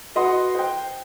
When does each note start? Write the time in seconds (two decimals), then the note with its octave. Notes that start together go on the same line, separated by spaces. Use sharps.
0.15 F#4 B4 D#5 F#5 C6
0.55 C5 G5